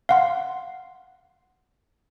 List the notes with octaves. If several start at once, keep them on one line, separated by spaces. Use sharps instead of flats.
F5 F#5 C6